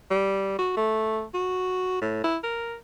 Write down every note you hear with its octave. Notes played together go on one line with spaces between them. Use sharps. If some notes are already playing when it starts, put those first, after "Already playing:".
G3
F#4
A3
F#4
A2
E4
A#4